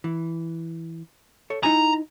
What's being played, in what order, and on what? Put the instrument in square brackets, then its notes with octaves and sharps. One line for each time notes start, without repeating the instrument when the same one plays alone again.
[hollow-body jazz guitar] E3
A4 C#5
[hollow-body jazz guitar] D#4 E4 G#5 [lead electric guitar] A#5